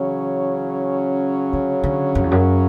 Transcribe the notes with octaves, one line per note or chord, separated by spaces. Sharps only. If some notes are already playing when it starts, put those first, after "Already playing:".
Already playing: C#3 E3 F#3 C#4
D3
D3
F#2
E2
F#2